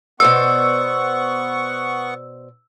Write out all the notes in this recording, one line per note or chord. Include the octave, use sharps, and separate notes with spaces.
B2 B3 C5 D5 F#5 C#6 E6